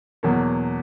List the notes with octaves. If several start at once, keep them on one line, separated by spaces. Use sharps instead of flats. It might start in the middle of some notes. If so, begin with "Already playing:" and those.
E2 B2 F#3 A#3